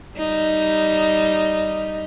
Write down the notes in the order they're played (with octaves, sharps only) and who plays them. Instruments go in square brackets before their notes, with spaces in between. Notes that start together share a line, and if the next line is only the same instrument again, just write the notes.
[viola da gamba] G3 D#4